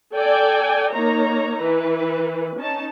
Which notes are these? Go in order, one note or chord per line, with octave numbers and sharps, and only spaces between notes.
A4 D5 G5 G#5
A#3 D#4 C#5 A#5
E3 B4
C#4 D#4 A5